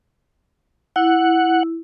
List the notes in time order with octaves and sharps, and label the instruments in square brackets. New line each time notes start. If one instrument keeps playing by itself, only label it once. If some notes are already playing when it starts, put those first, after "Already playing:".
[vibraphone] E4 [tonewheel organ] F#5